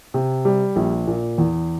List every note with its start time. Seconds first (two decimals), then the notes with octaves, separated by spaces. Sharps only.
0.14 C3
0.45 G3
0.76 A#1
1.07 A#2
1.38 E2